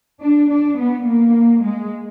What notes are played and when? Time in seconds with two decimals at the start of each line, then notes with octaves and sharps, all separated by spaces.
0.23 D4
0.51 D4
0.78 B3
1.06 A#3
1.63 G#3